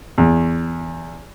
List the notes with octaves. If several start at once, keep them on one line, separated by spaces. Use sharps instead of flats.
E2